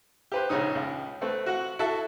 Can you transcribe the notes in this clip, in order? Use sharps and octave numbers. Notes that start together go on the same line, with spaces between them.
G4 B4 C5
A#1 C#3 C#4 D#4 D#6
C#2
A3 C4 B4
F#4 F#5
E4 F#4 A4 E5 A5